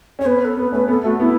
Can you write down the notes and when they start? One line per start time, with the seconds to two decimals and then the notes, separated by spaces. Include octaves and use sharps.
0.19 C#4 C#5
0.25 B3 B4
0.45 A4
0.57 B3 B4
0.72 A3 C#4 B4
0.88 B3 A4
1.04 A3 F#4
1.20 B3 E4